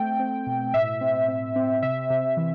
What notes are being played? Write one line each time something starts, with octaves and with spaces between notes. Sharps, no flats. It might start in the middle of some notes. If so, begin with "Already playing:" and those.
Already playing: A3 C4 G5
C4
B2
A2 E5
C4
C4
C4
C3 E5
C3
E3